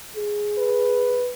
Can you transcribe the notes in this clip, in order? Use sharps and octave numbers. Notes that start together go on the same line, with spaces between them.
G#4
B4